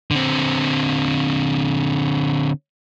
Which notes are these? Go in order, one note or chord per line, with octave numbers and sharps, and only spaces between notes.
D3 C4